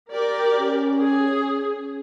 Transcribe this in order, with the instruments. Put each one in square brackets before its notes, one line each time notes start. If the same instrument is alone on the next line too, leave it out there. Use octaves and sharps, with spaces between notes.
[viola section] G4 A#4 D5
[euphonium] C#4
[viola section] G#4